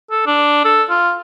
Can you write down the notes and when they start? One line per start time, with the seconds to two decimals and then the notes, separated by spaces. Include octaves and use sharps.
0.11 A4
0.26 D4
0.65 A4
0.90 F4